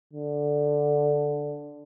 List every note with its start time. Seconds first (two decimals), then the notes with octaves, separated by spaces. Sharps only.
0.13 D3